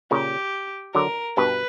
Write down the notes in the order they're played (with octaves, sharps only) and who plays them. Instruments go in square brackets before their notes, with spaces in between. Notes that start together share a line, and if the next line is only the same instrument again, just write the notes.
[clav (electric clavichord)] A#2 C#3 [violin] G4
[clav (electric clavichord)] D3 F#3 [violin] A#4
[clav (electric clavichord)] G2 B2 [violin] B4